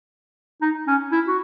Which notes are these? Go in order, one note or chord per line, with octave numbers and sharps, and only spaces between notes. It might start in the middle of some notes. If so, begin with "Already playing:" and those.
D#4
C#4
E4
F#4